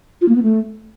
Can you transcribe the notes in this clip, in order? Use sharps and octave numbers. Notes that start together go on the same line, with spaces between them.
F4
A#3
B3
A3